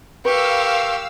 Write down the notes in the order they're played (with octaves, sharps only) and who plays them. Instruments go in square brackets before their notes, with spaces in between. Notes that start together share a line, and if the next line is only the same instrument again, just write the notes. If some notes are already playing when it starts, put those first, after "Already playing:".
[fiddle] G4 [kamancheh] A#4 C#6 [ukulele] B4 [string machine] F5 E6